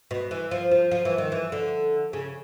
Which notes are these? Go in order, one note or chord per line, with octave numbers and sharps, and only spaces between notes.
B2
E3
F3
F3
F3
E3
D#3
E3
D3
C#3